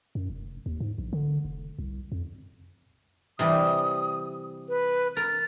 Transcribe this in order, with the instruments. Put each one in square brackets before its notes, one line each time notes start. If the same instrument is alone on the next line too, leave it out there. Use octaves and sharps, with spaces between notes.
[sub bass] F#2
F1
D#2
G#2
A#1
D3
F1
C2
F2
[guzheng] C3 E3 G3 [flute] D#6
[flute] B4
[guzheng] A#4 [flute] A6